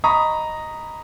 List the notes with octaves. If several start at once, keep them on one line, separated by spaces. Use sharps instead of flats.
D#5 A#5 B5 C#6 D#6